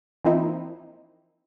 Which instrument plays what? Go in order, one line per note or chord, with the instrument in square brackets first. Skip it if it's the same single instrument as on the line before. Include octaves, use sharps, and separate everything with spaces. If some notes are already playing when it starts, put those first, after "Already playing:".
[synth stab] E3 F3 A#3 C4 D#4 E4